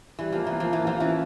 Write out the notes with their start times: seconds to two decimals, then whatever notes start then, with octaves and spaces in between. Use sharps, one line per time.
0.19 E3 G3
0.32 F3 A#3
0.47 E3 A#3
0.60 F3
0.69 E3 A#3
0.85 F3 F4
1.00 E3 C#4